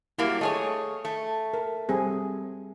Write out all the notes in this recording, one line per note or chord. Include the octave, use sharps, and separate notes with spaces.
F#3 G3 A#3 E4
A3 G#4 C#5 D#5
A3
A#4
G3 C4 G#4